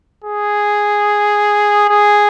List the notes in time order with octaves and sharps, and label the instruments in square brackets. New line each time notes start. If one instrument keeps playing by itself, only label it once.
[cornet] G#4
G#4